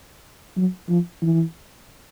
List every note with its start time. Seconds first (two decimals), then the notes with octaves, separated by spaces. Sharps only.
0.57 F#3
0.89 F3
1.22 E3